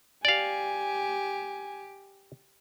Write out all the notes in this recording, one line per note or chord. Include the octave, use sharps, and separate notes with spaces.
G4 D5 F5 G#5